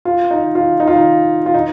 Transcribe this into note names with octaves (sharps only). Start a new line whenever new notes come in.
F4
D#4
F4
D#4
F4
D#4
F4
D#4